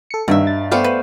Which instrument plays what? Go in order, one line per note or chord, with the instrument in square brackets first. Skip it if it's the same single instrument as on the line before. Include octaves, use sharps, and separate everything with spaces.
[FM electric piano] A4 C#7
[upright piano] G2 [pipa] B2 F#3 E5 [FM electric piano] D#3
[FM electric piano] A6
[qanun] A3 B3 C5 [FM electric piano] D5 F5 G5
[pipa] B4